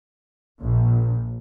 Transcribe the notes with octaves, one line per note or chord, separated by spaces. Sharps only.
A#1